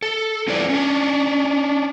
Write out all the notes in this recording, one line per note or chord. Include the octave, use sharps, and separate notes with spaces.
A4
C4 E4 A4 B4 D5
C#4 D4